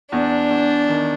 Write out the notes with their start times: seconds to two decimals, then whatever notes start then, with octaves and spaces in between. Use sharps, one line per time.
0.12 E2 D4
0.50 E2
0.89 D#3